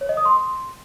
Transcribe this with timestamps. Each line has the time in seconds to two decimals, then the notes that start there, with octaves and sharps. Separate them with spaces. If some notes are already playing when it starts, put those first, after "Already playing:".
0.01 C#5
0.09 D#5
0.17 D#6
0.25 C6